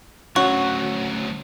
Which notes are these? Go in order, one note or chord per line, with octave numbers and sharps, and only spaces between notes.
D2 F#3 C#4 F#4 C#6